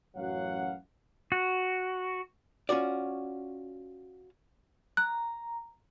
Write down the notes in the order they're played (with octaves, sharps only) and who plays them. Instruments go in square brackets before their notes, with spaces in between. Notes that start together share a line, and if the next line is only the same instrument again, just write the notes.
[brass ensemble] A1 F#2 F#3 F#4 F5 F#5
[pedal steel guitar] F#4
[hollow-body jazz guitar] C#4 F4 F#4 D5
[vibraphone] A#5 [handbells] F#6